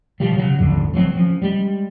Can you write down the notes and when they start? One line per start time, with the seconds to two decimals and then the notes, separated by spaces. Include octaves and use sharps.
0.20 B2 D#3 F3 G3
0.36 C#3 F#3
0.58 D#1 G#1 F2 D3
0.93 F3 F#3 A#3 C4
1.15 F3 C#4
1.42 G3 G#3